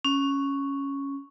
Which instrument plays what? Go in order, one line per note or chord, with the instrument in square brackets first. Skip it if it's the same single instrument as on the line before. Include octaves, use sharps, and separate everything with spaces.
[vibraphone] C#4